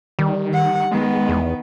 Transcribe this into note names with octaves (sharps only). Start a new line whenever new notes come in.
D#3 G3
F#5
D#3 G#3 B3
E2